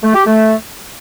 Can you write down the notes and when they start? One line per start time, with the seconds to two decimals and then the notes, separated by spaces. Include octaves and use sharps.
0.03 A3
0.14 G4
0.26 A3